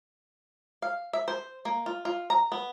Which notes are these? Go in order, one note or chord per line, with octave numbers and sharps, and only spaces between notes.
F5
E5
C5
A#3
F4
F4
A#5
B3